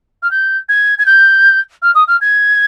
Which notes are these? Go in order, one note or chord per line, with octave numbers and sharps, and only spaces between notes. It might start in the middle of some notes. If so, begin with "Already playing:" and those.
F6
G6
G#6
G#6
G6
F6
D#6
F6
G#6